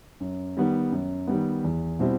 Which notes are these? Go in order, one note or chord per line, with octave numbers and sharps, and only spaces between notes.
F#2
D#3 G3 B3
F#2
D#3 G3 B3
E2
B2 G3 C4 E4